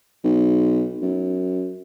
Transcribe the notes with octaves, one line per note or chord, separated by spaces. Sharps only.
B1
F#2